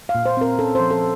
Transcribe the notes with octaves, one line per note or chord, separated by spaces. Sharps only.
F5
A#2
C5
C4 A#4
C#4 A4
F3 C5
A4